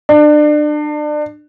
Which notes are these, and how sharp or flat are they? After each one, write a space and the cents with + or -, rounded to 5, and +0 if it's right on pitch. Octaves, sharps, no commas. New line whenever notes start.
D4 +30